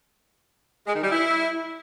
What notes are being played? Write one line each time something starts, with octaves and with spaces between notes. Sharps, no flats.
G#3
D#3
G3
E4